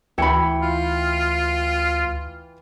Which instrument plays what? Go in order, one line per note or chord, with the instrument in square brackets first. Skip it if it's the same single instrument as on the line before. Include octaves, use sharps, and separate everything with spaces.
[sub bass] D2 [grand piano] E3 G5 C#7 [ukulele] E4 F#4 B5
[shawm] F4